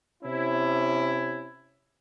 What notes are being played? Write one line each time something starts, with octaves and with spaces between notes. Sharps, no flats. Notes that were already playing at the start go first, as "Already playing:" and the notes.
C3 C#4 E4